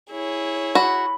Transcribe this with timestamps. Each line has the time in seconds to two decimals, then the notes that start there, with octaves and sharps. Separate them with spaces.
0.10 E4 G#4 C#5
0.75 F#4 B5